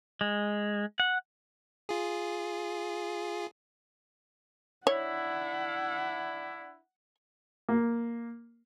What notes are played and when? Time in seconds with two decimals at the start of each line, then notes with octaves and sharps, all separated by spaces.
0.21 G#3
1.00 F#5
1.89 F4 G#4
4.87 D4 E4 C#5 F#5
7.69 A#3